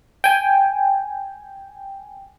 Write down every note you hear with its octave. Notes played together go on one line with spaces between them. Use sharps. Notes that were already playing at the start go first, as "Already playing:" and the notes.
G5 G#5